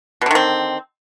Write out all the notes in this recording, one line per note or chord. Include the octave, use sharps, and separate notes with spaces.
B2 D3 D#3 C4